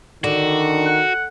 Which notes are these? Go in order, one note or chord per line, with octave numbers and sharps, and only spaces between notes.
D3 D#3 F#4
F#5